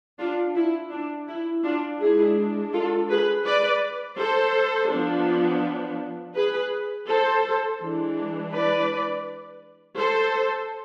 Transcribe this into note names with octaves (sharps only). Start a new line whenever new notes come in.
D4 F4
E4
D4
E4
D4 F4
G#3 D4 E4 G#4
F4 A4
G#4 B4
B4 D5
A4 C5
F3 B3 D4
G#4 B4
A4 C5
E3 G#3 D4
B4 D5
A4 C5